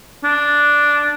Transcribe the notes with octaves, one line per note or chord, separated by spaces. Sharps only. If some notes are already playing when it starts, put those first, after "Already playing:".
D4